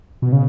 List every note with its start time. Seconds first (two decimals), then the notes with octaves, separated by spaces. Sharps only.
0.22 B2
0.32 C#3